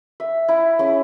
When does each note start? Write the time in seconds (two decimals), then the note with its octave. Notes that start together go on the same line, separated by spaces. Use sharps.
0.20 E5
0.48 E4
0.79 C#4 E4 G#4